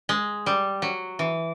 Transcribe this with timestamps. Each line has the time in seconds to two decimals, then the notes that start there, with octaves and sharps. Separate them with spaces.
0.09 G#3
0.46 G3
0.82 F#3
1.19 E3